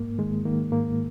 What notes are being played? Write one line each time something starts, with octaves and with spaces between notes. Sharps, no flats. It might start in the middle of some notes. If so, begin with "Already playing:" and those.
Already playing: G#2 A#3
D#3 G#3
D#3 A#3
G#2 A#3